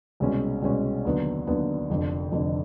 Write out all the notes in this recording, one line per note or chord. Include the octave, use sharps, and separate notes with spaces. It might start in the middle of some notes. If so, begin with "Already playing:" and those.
C2 B2 G#3 C#4
C2 B2 G#3 C#4
D#2 D3 F#3 B3
D#2 D3 F#3 B3
F1 F2 D3
F1 F2 D3